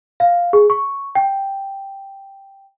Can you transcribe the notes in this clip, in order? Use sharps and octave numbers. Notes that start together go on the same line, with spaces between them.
F5
G#4
C#6
G5